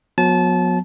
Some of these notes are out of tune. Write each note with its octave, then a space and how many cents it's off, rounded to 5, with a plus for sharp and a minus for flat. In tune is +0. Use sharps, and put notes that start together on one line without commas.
F#3 -35 B3 +0 A5 -25